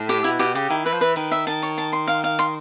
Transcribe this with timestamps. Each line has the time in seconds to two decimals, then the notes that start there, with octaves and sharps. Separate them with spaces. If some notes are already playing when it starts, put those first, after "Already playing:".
Already playing: A2
0.09 G4
0.24 B2 E4
0.39 B2 G4
0.54 C#3 G4
0.70 D#3 E4
0.85 E3 B4
0.94 F3
1.01 E3 B4
1.16 D#3 B4
1.31 E5
1.47 D#3 A5
1.62 C#5
1.78 A5
1.93 C6
2.08 F5
2.24 F5
2.39 C6